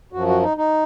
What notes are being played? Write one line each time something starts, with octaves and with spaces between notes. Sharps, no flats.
F#2 F3 F#4
F#4
D#4
D#4